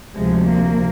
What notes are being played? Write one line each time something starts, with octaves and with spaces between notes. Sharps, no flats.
D2 C3 F3 G#3
A#3